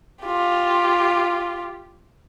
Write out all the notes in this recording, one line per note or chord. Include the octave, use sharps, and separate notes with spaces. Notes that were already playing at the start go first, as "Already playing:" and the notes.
F4 G4